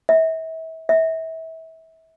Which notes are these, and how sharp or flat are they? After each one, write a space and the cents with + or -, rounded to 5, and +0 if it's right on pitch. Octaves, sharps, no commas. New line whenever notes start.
E5 -35
E5 -30